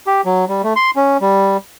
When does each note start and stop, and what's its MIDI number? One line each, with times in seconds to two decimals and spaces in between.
0.07 0.21 67
0.25 0.45 54
0.48 0.62 55
0.63 0.73 57
0.76 0.91 84
0.96 1.17 61
1.21 1.57 55